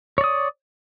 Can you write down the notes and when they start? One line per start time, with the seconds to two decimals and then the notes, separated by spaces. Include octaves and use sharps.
0.18 C#5
0.21 D5
0.24 D#6